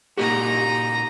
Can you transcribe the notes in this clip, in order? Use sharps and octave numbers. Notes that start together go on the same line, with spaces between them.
A#2 A#3 D#4 F#4 G4 A#5